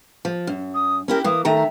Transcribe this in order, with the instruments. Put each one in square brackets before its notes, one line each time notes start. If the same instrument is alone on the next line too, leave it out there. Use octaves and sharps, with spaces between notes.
[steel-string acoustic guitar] F3
F#2
[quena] D#6
[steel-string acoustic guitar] C#4 E4 G4 [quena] A#4
[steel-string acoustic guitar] E3 A#3 [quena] D#6
[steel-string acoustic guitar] D#3 A3 A#5 [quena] E5